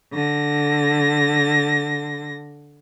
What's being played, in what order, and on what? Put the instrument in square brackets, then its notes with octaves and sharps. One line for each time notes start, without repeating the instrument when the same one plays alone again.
[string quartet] D3 A#6